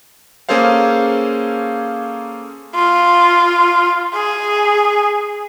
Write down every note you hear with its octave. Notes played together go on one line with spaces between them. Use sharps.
A#3 C#4 G#4 A4 C5 F5
F4
G#4